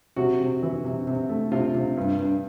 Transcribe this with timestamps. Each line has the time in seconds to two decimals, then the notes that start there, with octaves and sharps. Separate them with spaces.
0.16 C3 F#4
0.40 C3
0.63 E3
0.85 C3
1.07 C3
1.29 A3
1.52 C3 F4
1.75 C3
1.97 G2
2.19 G2